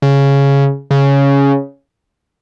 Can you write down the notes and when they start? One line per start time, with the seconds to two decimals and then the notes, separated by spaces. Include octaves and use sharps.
0.02 C#3
0.91 C#3